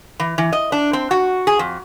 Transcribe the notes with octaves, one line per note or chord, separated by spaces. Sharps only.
E3
E3
D#5
D4
C4
F#4
G#4
F2